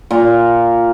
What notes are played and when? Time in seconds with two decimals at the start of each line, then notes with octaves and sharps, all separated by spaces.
0.11 A#2